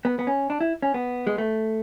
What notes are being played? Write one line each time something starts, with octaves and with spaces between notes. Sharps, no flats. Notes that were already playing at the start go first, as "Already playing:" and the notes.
B3
B3
C#4
D4
E4
C#4
B3
G#3
A3